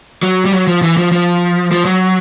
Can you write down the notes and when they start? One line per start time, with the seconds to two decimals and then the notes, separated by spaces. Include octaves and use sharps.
0.23 F#3
0.45 G3
0.52 F#3
0.67 F3
0.82 E3
0.97 F3
1.12 F3
1.72 F3
1.85 F#3